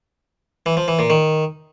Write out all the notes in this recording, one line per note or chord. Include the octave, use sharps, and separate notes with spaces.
E3
F3
E3
A#2
D#3